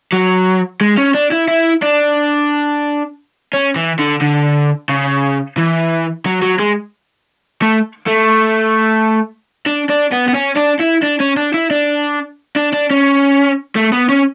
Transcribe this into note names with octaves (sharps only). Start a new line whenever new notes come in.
F#3
G#3
C#4
D4
E4
E4
D4
C#4
E3
D3
D3
C#3
E3
F#3
F#3
G#3
A3
A3
D4
D4
B3
B3
C#4
D4
E4
D4
C#4
D4
E4
D4
D4
D4
C#4
A3
B3
C#4